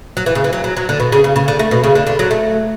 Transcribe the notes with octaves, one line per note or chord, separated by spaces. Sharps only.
F#3
E3
C#3
E3
F#3
F#3
F#3
D3
B2
C#3
C#3
C#3
D3
A3
B2
C#3
D3
D3
F#3
A3